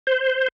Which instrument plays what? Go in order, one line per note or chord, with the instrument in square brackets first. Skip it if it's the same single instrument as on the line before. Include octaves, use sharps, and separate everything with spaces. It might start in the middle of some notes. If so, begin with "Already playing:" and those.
[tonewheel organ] C5